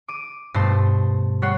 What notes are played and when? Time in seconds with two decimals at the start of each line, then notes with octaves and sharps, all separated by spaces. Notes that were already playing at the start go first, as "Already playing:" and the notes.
0.08 D6 D#7
0.54 G2 B2 A3 C5
1.42 G3 C#5 F#5 C7